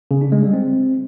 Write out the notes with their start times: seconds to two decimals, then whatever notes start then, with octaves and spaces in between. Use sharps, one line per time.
0.11 C#3
0.21 D4
0.32 G#3
0.43 G3
0.53 C4